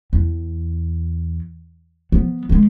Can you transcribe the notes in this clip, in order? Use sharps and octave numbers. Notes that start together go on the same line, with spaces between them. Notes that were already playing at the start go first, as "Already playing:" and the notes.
E2
F3 B3
D#3 G#3